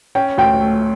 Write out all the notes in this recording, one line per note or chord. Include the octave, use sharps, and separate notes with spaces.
C#4 G5
D2 G5
A3